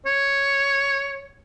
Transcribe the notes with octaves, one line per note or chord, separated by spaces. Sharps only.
C#5